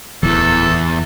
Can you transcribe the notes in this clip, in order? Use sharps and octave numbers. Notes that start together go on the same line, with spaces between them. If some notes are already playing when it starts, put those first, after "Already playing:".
D1 E2 E3 A4